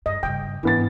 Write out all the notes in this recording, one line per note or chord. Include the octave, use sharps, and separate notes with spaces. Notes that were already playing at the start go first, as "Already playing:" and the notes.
G2 D#5
G2 C#3 G5
G#2 E3 B3 A6